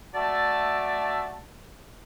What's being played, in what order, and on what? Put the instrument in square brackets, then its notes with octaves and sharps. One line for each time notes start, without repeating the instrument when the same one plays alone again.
[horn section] A3 F#4 D5 E5 A5